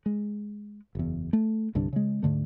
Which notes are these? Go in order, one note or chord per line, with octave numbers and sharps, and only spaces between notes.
G#3
F#1 E2
A3
C2 G2 D3 D4
C#3 G#3
D2 G#2 D3 A3